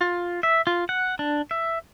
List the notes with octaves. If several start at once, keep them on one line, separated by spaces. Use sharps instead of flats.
F4
E5
F4
F#5
D4
E5